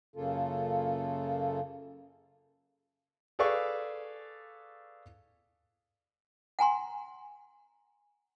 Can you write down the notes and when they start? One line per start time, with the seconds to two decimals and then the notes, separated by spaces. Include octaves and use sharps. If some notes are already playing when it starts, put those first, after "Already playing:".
0.16 F#2 C#3 A#3 F4 A4
3.39 G#4 A4 B4 D5 F5 C#6
6.59 F#5 G#5 A#5 C6